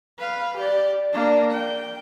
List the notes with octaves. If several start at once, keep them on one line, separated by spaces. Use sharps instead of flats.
B4 F5
G4 D5
A#3 D4
G5